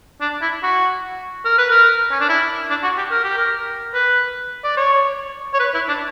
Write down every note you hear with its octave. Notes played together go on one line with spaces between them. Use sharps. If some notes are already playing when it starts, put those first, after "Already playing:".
D4
E4
F#4
A#4
B4
A#4
C#4
D4
E4
D4
F#4
G4
A#4
G4
A#4
B4
D5
C#5
C#5
B4
E4
D4